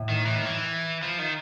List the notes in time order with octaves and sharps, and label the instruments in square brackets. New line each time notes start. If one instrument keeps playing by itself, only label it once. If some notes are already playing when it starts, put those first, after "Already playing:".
Already playing: [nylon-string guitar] A2
[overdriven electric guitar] D#3
E3
D#3
E3
F3
D#3